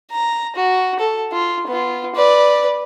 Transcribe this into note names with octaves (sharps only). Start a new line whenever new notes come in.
A#5
F#4
A4
F4
B3 F4
B4 D5